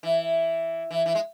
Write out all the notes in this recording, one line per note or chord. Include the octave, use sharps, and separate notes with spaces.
E3
E3
E3
G#3